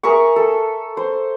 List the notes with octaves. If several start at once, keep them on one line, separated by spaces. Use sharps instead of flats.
G#4 A#4 E5 C#6
A4
C5